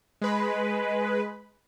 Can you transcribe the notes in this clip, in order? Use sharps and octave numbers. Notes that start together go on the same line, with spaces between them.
G#3 B4